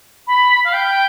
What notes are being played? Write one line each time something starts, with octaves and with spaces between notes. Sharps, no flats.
B5
F5
G5